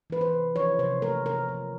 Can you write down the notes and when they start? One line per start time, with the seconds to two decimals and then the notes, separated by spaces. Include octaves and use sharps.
0.10 E3 B4
0.21 C5
0.33 C3
0.56 F3 C#5
0.79 C3 C5
1.02 A3 A#4
1.26 C3 A#4
1.49 F3